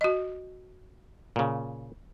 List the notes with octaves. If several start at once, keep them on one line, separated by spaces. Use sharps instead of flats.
F#4 D#5
A#2 C#3